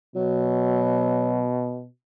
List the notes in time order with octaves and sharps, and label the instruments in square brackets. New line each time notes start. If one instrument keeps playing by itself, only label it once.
[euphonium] B2 [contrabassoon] F#3